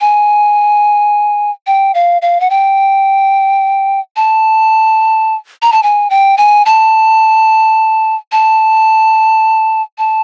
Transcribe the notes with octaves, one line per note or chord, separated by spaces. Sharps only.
G#5
G5
F5
F5
F#5
G5
A5
A#5
A5
G#5
G5
G#5
A5
A5
A5